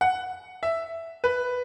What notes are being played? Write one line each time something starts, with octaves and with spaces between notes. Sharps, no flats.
F#5
E5
B4